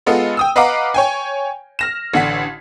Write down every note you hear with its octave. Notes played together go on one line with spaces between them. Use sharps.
G#3 B3 F4 A4 D#5
G5 D#6 E6
B4 D#5 F5 F#5 A#5 D6
C#5 G5 G#5
F6 A#6 E7
A1 D3 F#5 B6